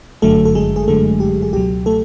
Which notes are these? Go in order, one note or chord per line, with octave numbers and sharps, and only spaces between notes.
G1 F#2 D3 F#3 A3 A4
A4
G#3 G#4
G#4
G1 F#2 D3 F#3 A3 A4
G4
G#4
C#2 B2 F#3 G4
A3 A4